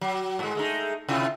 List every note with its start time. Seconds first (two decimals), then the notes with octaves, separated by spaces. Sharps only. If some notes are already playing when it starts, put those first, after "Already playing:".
0.01 F#3
0.39 G#2 G#3
0.55 G#3 A3 D#4
1.09 C3 E4 F4